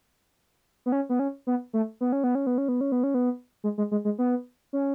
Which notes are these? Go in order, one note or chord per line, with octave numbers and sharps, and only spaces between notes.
B3
C#4
B3
C#4
B3
A3
B3
C#4
B3
C#4
B3
C#4
B3
C#4
B3
C#4
B3
G#3
G#3
G#3
G#3
B3
C#4